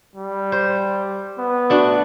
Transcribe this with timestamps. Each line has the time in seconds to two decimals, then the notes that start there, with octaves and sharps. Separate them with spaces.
0.16 G3
0.52 C5
1.38 B3
1.70 A3 D4 F#4